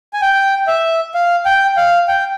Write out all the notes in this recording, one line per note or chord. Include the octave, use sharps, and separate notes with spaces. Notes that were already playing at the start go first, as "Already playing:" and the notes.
G#5
G5
E5
F5
G5
F5
G5